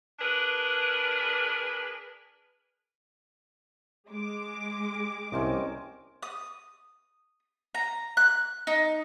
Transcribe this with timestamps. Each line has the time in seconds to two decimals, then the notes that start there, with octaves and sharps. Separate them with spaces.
0.19 D4 G#4 A#4 B4
4.10 G#3 D6
5.32 C2 C3 C#4 C5 D#5
6.23 D#6
7.74 A#5
8.17 F#6
8.67 D#4